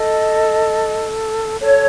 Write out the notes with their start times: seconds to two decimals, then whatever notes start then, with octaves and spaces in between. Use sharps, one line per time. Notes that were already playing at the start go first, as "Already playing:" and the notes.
Already playing: A4 D#5
1.61 A4 C#5